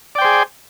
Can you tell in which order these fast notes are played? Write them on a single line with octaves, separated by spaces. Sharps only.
D5 G5 C5 G#4